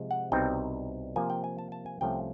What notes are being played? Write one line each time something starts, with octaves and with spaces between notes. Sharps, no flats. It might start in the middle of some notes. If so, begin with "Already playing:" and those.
Already playing: C3 F3 G#3
F#5
C2 B2 G3 C4 D#4 G5
C3 F3 A#3 G#5
G5
G#5
A5
A5
G#5
C2 C3 F3 A3 C#4 G5